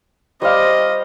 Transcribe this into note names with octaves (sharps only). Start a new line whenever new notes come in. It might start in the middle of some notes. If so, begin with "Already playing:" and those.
G3 C5 D5 D#5 F5